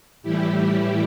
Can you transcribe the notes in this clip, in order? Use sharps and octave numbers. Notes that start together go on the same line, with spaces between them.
A2 E3 G3 E4 G4